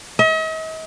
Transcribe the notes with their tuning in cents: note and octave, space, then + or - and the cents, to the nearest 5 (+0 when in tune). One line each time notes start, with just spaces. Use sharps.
D#5 +45